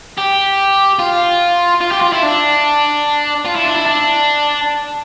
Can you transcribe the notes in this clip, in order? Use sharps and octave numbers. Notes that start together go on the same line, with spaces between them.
G4
F4
F4
G4
F4
E4
D4
F4
E4
D4
E4
D4